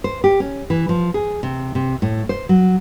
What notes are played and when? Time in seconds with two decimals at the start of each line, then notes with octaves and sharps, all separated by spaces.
0.04 C5
0.24 G4
0.40 C#4
0.70 E3
0.89 F3
1.14 G#4
1.43 C3
1.75 C3
2.02 A2
2.29 C5
2.49 F#3